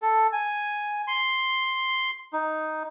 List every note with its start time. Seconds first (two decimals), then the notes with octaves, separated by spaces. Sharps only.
0.02 A4
0.32 G#5
1.08 C6
2.33 D#4